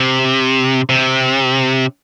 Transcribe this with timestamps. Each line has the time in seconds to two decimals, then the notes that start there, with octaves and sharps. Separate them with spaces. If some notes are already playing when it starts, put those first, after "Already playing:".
Already playing: C3
0.89 C3